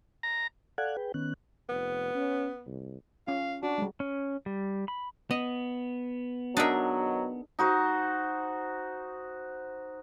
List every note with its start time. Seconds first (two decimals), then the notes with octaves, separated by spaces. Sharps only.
0.23 A#5
0.78 A4 D5 F5 F#5 F#6 G#6
0.97 G#4 B4 G5
1.14 D#3 B3 C#4 F#6
1.69 F1 B3
2.15 C#4
2.67 C2
3.27 C#4 F4 F5
3.63 D4 F#4
3.78 G3 G#3
4.00 C#4
4.46 G3
4.88 B5
5.31 B3 D#5
6.57 B2 D#3 F#3 D4 D#4 G#4 A#4 E5
7.59 D#4 F#4 C5